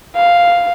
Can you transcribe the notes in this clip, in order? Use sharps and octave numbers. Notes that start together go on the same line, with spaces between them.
F5